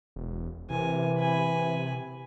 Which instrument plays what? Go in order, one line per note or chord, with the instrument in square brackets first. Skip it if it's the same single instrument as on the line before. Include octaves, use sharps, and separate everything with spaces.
[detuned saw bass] E1
[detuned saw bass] C3 [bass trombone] E3 [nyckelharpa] A#4 G#5
[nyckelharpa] G#5 B5